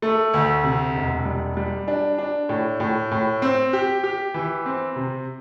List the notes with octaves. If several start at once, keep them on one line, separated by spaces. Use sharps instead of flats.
A3
D2
C3
E1
G3
G3
D4
D4
A2
A2
A2
C4
G4
G4
E3
C4
C3